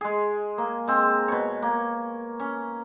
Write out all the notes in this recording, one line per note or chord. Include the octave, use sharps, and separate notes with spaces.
G#3 G#4
A#3
G#3 C4
B2 C#5
A#3
C#4